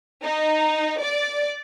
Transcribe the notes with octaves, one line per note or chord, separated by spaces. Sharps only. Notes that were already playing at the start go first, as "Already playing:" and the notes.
D#4
D5